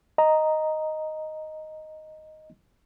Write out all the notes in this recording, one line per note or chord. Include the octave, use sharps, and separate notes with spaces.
D#5 A#5